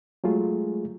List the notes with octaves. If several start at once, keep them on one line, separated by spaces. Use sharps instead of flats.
F#3 G#3 A3 F4 G#4